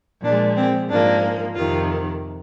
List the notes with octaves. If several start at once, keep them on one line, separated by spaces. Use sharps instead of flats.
A#2 F3 G#3 D4
C4
G#2 F3 A#3 D4
F2 C3 D#3 F4